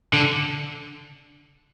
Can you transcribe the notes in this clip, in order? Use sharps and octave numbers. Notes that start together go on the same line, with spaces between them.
D3